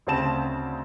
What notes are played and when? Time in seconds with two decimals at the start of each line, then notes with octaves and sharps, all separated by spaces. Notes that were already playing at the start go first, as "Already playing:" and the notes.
0.07 D2 C#3 C4 A5 E7